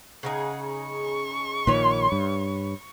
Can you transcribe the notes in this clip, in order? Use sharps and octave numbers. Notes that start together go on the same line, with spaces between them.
C#3 D#4 G#4 F#5
C#6
A#1 A#2 D#3 B4 C#5
G2